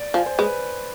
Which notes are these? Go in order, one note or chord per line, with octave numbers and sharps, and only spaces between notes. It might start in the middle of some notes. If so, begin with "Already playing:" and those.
Already playing: D5
F3 G#5
C5
G#3 B4